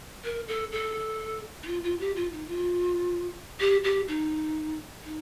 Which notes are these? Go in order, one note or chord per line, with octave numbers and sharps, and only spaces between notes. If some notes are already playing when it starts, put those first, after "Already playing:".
A#4
A4
A4
D#4
F4
F4
G4
F4
D#4
F4
G4
G4
D#4
D#4